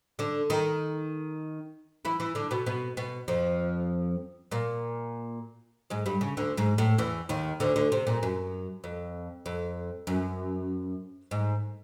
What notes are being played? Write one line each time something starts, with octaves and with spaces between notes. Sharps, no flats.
D3 D4
D#3 D#4
E3 E4
E3 E4
D3 D4
B2 B3
B2 B3
B2 B3
F2 F3
A#2 A#3
G#2 G#3
G2 G3
C#3
D2 D3
G#2 G#3
A2 A3
E2 E3
D#2 D#3
D2 D3
D2 D3
C3
A#2
F#2
F2
F2
F#2
G#2